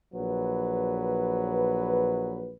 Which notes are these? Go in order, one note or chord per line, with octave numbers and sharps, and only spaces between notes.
A#1 F#3 B4